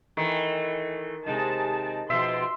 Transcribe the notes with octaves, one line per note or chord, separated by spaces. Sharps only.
D#3 E3 A3
C3 G#3 D#4 A5
B2 F3 E5 C6